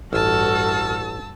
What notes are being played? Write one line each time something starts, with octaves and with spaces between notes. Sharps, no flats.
A1 G2 F#4 A4 A5 E6 F6